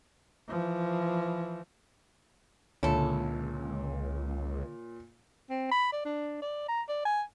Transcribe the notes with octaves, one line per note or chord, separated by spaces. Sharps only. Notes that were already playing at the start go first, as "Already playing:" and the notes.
E3 F3
C#2 A#2 D3 E4 A4 C#5
C4
B5
D5
D4
D5
A#5
D5
G#5